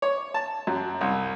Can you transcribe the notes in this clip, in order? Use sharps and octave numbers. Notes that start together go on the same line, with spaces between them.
C#5
A5
F#2
C2